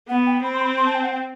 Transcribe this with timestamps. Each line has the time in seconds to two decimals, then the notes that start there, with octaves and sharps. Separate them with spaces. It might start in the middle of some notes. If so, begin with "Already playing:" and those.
0.08 B3 F#5
0.26 G5
0.43 C4 B5
0.53 C6
0.60 B5
0.77 C6
0.86 A5
0.94 G5
1.02 F#5
1.11 G5